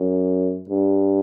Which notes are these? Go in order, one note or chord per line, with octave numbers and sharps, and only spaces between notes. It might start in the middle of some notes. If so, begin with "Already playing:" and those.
Already playing: F#2
G2